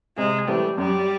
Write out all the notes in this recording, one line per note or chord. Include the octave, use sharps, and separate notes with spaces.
C3 G#3
E3 G3 A3 C4
F#2 G3